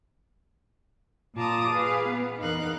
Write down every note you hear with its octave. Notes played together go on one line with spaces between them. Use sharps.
A#2 F4 A5 A#5 D6 D#6
G#4 B4 F5
B3
E2 D#4 A#4 F5 F#6